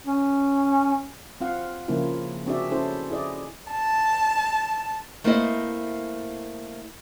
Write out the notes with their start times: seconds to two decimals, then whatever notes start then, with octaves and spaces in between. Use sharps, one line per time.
0.07 C#4
1.41 C4 F4 F5 F#5
1.88 C#3 F3 A#3 C#4 E4 F4
2.46 C4 D4 F#4 G#4 D5 E5
2.71 C#4 E4 A4 C5
3.11 E4 G#4 D5 D#5
3.71 A5
5.24 A3 A#3 C4 E4 C5 D#5